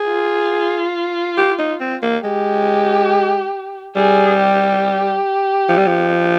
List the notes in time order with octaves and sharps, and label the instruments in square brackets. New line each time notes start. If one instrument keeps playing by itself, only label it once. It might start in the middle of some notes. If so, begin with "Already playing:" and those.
Already playing: [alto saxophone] G#4
[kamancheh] F4
[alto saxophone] G4
D#4
C4
A#3
[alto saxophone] G#3 [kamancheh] G4
[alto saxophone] G3 [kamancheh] G#4
[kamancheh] G4
[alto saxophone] F3
G3
F3